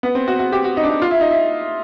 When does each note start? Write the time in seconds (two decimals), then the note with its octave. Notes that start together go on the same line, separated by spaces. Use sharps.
0.03 B3
0.15 C4
0.28 F#4
0.39 F#4
0.52 G4
0.64 F#4
0.77 D#4
0.83 D4
0.89 D#4
1.02 F4
1.11 E4
1.21 D#4
1.31 E4